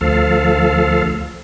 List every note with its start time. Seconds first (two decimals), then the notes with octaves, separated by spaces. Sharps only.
0.01 D2 F3 A4 F5